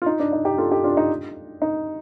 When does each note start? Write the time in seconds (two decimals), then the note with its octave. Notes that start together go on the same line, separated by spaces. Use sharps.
0.02 F4
0.06 D#4
0.20 D4
0.33 D#4
0.45 D#4 G4
0.58 F4 A4
0.71 D#4 G4
0.84 D4 F4
0.97 D#4
1.62 D#4